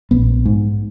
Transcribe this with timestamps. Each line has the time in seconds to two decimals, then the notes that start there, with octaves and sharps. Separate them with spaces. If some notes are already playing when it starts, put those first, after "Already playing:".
0.11 A#1 B3
0.45 G#2